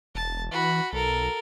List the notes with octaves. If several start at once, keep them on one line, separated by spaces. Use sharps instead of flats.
E1 A5
E3 F#4 B5
B1 A4 A#4